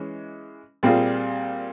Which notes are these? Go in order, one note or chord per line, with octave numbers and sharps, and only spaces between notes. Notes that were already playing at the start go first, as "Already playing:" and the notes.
Already playing: E3 G#3 C#4
A#2 G3 C4 F4 G#4